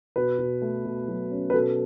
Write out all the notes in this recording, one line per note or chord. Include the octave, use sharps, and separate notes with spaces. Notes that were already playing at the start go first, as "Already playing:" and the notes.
B2 B4
B2
A3
B2
F#3
C#4
B4
B2 A4